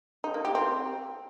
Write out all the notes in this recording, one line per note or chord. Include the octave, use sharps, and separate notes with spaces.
D#4
A#3
G4
C4